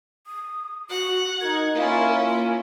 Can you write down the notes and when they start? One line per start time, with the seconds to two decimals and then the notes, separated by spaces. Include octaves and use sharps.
0.26 D#6
0.90 F#4 F#5
1.40 D#4 A#4 G#6
1.75 A#3 C#4 E4 F4
2.27 A#4